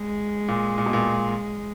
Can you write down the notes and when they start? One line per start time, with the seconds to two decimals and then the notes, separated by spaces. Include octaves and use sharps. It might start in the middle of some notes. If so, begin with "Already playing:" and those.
Already playing: G#3
0.48 A#2
0.78 A#2
0.86 B2
0.93 A#2